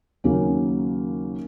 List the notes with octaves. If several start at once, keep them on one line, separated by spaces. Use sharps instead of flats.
D#2 C#3 F#3 A#3 C#4